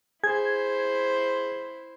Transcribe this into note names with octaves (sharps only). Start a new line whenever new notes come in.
E4 G#4 C5 G#6